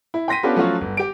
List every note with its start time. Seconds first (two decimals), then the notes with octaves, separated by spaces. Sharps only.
0.14 E4
0.28 G5 C6 A#6 B6 D#7
0.43 B3 C#4 D4 F4 G4 A4
0.56 F3 F#3 A3 C#4 F4 F#4
0.81 G1
0.97 G4 D7